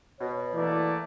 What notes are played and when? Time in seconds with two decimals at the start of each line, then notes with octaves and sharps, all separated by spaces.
0.20 B2 C#5
0.54 E3 A3 A#3 D5